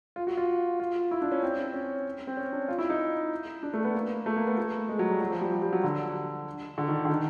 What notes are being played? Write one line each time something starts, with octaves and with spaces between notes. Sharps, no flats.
F4
F#4
F4
F4
E4
D4
C#4
C4
C#4
C4
C#4
D4
F4
E4
D#4
D4
A3
B3
A#3
A3
A#3
B3
A3
G#3
F#3
G3
F#3
F3
G3
G3
G3
F#3
D3
D3
D#3
D3
D#3